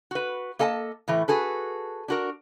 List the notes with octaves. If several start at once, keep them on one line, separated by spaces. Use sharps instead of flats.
F#4 B4
A#3 A4 D#5 G#5 A5
A2 E3 A3
F#4 G#4 A4 B4
D4 F#4 A#4